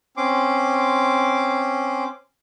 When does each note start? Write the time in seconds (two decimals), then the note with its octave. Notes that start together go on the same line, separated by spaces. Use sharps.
0.17 C4 C#4 C6 D6